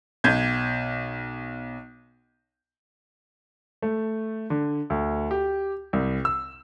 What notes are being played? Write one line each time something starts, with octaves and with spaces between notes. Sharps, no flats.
B1 G6 G#6
A3
D3
D2
G4
C2
E6